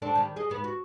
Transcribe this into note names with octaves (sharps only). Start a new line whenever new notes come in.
C4 D4 A4
D#3 G3
G#4 D#5
G#2 B3
F#4